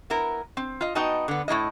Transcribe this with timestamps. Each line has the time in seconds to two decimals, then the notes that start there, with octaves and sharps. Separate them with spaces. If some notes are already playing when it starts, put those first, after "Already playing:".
0.10 B3 E4 A#4
0.57 C4
0.81 F4 D#5
0.95 B3 D#4 F#4 D#5 G5 A5
1.28 D3 B3
1.48 A2 A#3 E4 D#5